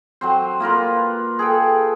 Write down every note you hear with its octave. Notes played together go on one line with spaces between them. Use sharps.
F#3 C4 C5
A#3 F4 A#4 B4
G#4 A4 G5